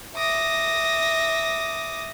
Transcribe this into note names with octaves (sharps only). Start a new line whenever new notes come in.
E5 D6 D#6 A#6